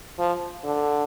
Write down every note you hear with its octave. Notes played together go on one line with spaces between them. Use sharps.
F3
D3